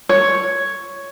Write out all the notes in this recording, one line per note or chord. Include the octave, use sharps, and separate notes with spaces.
C#5